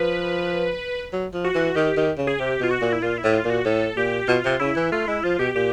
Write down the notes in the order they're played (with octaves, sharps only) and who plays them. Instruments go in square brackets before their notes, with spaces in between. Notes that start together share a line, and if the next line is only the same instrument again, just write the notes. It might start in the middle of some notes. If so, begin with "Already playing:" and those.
Already playing: [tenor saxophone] F3 [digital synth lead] B4
[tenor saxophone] F#3
F3
[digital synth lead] F#4
[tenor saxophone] E3
[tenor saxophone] D#3 [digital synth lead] G4
[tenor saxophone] D#3
C#3
[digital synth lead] G#4
[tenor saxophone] C3 [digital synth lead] G4
[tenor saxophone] B2 [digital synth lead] F4
[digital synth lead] F#4
[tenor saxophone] A#2
[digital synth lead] E4
[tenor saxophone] A#2 [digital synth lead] F4
[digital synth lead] E4
[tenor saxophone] A2
[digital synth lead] F4
[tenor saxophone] A#2
[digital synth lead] F#4
[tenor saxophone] A2 [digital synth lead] A4
[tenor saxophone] A#2 [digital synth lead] G4
[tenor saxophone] B2 [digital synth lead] F4
[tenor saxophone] C3
[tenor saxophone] C#3 [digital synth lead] E4
[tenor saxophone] E3
[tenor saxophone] A3 [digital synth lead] F4
[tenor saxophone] G#3 [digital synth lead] E4
[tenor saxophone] F3 [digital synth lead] F4
[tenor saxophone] B2 [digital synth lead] G4
[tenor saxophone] A#2 [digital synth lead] G4